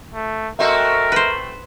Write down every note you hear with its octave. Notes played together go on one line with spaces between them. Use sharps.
A3
A3 C4 F#4 A#4 D#5 E5
B4 C5